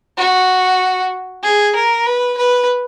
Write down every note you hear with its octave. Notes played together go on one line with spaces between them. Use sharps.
F#4
G#4
A#4
B4
B4